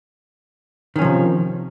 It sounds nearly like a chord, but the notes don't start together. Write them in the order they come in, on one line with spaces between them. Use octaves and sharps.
D#3 C#4 F3 C3